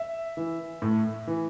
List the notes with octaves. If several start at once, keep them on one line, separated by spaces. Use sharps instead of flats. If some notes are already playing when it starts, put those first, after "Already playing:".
Already playing: E5
E3
A2
E3